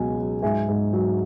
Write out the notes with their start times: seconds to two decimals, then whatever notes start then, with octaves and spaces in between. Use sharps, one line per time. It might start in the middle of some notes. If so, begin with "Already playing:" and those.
Already playing: C#2 B2 F#3 G#5
0.18 F#3
0.42 G#2 E5 G#5
0.68 G#2
0.93 F#3